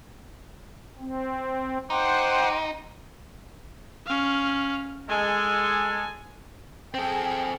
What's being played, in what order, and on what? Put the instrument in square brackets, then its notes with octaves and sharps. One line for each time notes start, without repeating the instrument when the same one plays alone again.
[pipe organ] C4
[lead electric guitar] D#4 [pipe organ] C5 F#5 [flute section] G5 C6 D6
[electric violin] C#4 F5
[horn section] G#3 A4 [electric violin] G#5
[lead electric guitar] C4 A4 [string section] G#4 G5